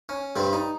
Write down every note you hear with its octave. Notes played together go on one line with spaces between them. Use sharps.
C#4
G2 G3 C4
D#4